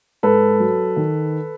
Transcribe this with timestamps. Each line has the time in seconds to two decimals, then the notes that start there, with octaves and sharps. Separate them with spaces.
0.23 G#2 A4 B4
0.60 F#3
0.96 D#3